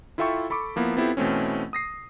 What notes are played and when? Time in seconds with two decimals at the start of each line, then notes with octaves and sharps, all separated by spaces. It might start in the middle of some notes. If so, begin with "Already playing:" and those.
0.18 E4 F4 A4 E5 G5 C#6
0.50 A4 B5 C#6 D6
0.76 F3 A#3 B3 E4
0.97 B3 C4 E4 F4 G4 A4
1.17 B2 E3 A3 C4 C#4
1.73 D#6 A#6 C7